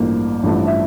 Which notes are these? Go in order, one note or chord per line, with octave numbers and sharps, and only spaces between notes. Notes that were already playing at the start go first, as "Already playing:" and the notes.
Already playing: A1 G2 F3 A#3
A1 G2 F3 A3
E5